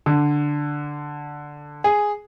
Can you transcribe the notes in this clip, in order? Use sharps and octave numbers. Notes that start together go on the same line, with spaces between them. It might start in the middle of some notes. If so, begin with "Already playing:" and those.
D3
G#4